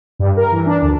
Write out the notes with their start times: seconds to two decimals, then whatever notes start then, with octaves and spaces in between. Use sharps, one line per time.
0.19 G2
0.37 A#4
0.52 E3
0.67 D4
0.82 D2